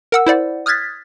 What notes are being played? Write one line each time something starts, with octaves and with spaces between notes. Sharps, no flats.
A#4 F#5 E6
E4 C5 D5 F#5
D#6 F6 F#6 G#6 A6 B6